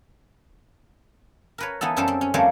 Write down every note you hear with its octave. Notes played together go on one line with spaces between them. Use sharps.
A#4 B4 C#5
E3 B3 D#4 A4
F#2 G3 C#4 A4 C5 A5
C4
C#4
F2 G3 A3 A#3 C5 C#5